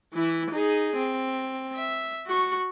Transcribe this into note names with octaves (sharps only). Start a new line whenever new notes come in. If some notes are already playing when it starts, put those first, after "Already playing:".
E3 E4
D#4 G#4
C4
E5
F#4 C#6